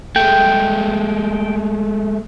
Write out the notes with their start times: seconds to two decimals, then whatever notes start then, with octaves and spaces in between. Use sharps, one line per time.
0.16 G#3 A3 G5